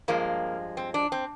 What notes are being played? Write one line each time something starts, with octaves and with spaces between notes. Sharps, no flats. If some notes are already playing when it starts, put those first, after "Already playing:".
G2 F3 G#3 A#3
C4
D4
C4